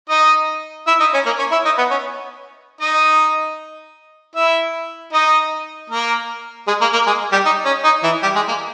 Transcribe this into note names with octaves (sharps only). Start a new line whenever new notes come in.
D#4 D#5
E4 E5
D#4 D#5
C#4 C#5
A#3 A#4
C#4 C#5
E4 E5
D#4 D#5
B3 B4
C#4 C#5
D#4 D#5
E4 E5
D#4 D#5
A#3 A#4
G#3 G#4
A#3 A#4
A#3 A#4
G#3 G#4
G3 G4
D#4
C#4
D#4
E3 E4
G3 G4
G#3 G#4
A#3 A#4